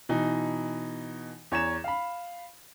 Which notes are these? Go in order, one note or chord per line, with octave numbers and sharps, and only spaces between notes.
B2 E3 D#4
E2 C#5 A#5 E7
F5 B5